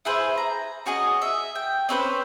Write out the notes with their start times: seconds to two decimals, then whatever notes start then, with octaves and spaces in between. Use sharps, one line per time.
0.05 E4 G#4 B4 C5
0.38 A#5
0.86 C#4 F#4 G#4 D#5
1.22 E5
1.55 G5
1.89 C4 C#4 B4 C5